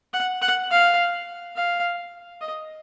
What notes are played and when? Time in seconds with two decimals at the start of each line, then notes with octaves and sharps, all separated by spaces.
0.13 F#5
0.42 F#5
0.71 F5
1.56 F5
2.41 D#5